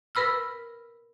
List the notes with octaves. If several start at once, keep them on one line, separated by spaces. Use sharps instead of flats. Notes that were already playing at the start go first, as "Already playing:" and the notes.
A#4 B4 B5 E6 F6